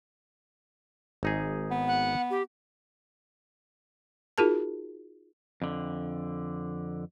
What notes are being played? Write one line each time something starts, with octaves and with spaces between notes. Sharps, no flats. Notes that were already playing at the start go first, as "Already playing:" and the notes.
G#1 D#4 G#4
B3
F#5
G4
D#4 F4 F#4 G#4 A#4 A5
F2 D3